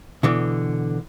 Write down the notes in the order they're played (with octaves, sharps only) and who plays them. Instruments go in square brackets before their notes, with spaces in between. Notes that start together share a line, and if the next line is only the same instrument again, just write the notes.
[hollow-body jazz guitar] B2 D3 E3